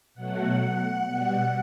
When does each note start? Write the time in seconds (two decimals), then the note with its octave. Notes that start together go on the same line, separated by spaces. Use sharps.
0.15 B2 F#3 A3 F#5
0.59 F#5
1.04 B2 G3